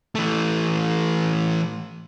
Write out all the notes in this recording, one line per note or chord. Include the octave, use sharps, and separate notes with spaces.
E3 A3